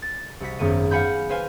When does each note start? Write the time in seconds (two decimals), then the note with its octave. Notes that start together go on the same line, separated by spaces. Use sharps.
0.02 A6
0.40 C2 F#4 B6
0.59 G#1 F#2 B3 D#7
0.91 F5 F#5 G#5 B5 G6
1.29 B4 C5 F5 G#5